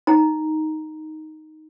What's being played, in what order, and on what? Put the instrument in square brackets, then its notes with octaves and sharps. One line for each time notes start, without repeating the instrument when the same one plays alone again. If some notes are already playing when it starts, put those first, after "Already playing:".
[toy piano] D#4 A#5